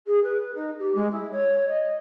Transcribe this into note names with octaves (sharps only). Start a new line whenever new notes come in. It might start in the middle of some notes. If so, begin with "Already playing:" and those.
G#4
B4
D#4
G4
G#3
E4
C#5
D#5